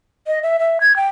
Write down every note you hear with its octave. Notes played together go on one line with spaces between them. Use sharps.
D#5
E5
E5
G#6
G5